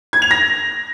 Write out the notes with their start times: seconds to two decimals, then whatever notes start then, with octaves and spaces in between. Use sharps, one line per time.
0.13 G#6
0.22 F7
0.31 A#6